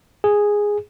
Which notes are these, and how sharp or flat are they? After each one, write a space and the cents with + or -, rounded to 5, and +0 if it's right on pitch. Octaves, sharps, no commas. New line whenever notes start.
G#4 -5